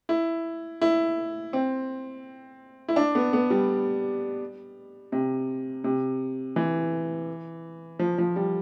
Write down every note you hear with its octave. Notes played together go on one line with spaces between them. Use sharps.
E4
E4
C4
E4
D4
B3
B3
G3
C3
C3
E3
F3
F3
G3